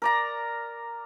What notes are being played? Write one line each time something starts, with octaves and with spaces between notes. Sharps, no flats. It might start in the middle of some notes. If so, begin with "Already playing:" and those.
A#4 D5 A#5